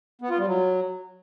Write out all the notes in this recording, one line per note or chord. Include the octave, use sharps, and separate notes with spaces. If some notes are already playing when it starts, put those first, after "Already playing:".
B3
F4
G3
F#3